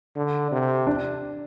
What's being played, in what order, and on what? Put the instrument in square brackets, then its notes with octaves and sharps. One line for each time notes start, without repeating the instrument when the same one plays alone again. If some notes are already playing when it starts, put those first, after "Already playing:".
[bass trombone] D3
C3
[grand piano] D4